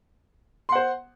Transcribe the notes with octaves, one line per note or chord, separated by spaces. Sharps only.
C5 F#5 C6